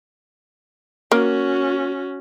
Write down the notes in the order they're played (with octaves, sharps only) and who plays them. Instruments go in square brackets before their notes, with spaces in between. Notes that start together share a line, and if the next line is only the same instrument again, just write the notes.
[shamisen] A#3 [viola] C#4 F#4